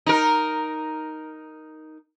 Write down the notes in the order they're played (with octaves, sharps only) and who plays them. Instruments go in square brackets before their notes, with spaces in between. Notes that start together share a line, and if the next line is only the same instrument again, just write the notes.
[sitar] D#4 A#4